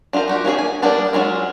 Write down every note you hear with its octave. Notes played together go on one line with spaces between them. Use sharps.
D4 F4 A4 A#4 C5
D#4 F#4 G4
A#3 C#4 D4 G#4
G#5
G3 A#3 B3 D4 E4
F#3 G#3 C#4 F4